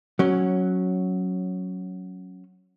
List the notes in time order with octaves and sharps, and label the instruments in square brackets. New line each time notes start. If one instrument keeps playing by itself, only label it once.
[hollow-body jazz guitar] F#3 C#4